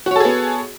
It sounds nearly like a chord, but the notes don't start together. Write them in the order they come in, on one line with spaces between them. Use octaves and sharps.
F#4 C#5 A4 G#4 B3